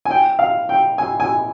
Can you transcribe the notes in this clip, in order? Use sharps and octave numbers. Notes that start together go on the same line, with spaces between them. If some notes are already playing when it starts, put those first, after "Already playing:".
G#5
G5
F5
G5
G#5
G#5